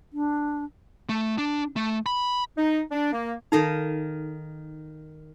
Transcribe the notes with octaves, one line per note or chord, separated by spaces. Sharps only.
D4
A3
D4
A3
B5
D#4
D4
A#3
D#3 D#4 A4 D#5 F5